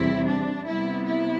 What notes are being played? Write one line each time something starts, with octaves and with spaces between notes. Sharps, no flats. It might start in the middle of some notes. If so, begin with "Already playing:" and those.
Already playing: E2 C3 G3 C4 E4
D4
C3 G3 B3 E4
E4